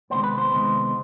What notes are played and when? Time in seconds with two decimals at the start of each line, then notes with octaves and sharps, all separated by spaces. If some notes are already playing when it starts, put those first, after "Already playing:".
0.10 C3 D#3 G#3 B3 C5
0.24 B4
0.38 C5
0.51 C3 D#3 G#3 B3